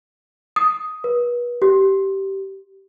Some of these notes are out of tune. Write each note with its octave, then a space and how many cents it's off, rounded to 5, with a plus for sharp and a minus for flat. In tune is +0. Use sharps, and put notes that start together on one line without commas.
D#6 +5
B4 -35
G4 -15